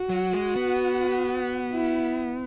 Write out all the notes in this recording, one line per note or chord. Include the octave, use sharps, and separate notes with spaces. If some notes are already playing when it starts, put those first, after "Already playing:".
Already playing: F#4
F#3
G#3
B3
E4